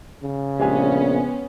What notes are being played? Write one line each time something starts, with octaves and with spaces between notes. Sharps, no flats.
C#3
A#1 G#3 B3 C#4 G4 G#5